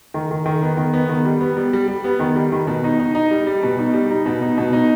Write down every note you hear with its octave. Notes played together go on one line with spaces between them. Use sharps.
D#3
D#3
D#3
B3
D#3
B3
D#3
G3
B3
G3
G3
G3
B3
D#3
G3
D#3
B2
D#4
D#4
D#4
G3
G3
B2
D#4
G3
D#4
B2
D#4
B2
D#4